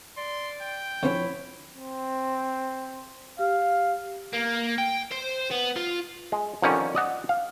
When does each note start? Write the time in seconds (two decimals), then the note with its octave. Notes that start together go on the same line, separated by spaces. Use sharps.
0.17 D5 C6
0.62 G5
1.03 D3 F3 C4 C#4 E4 C#5
1.73 C4
3.39 G4 F5
4.34 A#3
4.78 G5
5.11 C5
5.51 B3
5.76 F4
6.32 G#3
6.62 F2 D3 D#3 G3 C#4
6.95 D5 D#5 F#5
7.29 F5